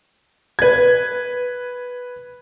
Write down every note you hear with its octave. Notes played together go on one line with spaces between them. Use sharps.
B4 G#6